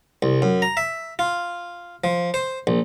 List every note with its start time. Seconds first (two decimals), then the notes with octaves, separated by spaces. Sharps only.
0.22 C2
0.42 F#2
0.62 A#5
0.77 E5
1.19 F4
2.04 F3
2.34 C5
2.67 A#1